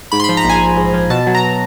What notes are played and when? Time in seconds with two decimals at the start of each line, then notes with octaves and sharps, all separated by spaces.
0.12 G#2 B5
0.20 C6
0.24 F3 B5
0.37 A#5
0.45 A#1 G#5
0.61 A#1
0.78 G#2
0.94 F3
1.10 B2 A5
1.27 F#3
1.35 A#5